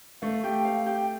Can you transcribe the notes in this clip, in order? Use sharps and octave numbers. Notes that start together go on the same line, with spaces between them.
A3 F5
G4
F5
G4